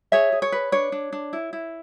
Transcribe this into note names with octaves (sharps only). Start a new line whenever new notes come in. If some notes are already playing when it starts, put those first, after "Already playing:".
G#4 C#5 E5
G#4
C#5
B4
D4 C#5
D4
D4
E4
E4